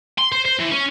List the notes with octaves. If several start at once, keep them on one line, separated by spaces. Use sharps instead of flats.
C6
C5
C5
E3
C#4